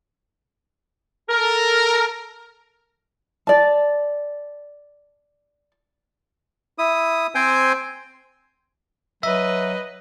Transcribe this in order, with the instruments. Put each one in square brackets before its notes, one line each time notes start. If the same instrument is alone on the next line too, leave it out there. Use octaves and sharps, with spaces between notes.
[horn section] A4 A#4
[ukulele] D5 A5
[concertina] E4 D#6
C4 C5 G5 G#5
[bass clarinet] F#3 [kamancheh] B4 D#5 [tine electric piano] E5